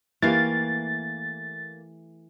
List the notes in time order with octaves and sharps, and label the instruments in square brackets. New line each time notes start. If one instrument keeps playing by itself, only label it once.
[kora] E3 A3 G4 [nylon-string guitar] A#3 F5 [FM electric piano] A6